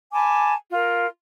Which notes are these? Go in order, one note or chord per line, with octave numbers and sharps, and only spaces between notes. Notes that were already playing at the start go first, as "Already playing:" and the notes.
G#5 A5 B5 D6
F4 A#4